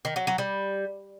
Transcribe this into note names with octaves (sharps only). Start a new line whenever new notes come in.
D#3
F#3
F#3
G3